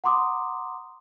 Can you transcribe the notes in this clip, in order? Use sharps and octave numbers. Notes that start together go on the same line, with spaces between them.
F#5 A#5 C6 D6 D#6